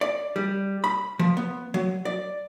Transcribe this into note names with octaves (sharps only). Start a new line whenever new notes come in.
D5
G3
B5
F3
B3
F#3
D5